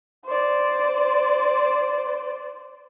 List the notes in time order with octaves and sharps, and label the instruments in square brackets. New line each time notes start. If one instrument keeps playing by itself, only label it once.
[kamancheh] C5 D5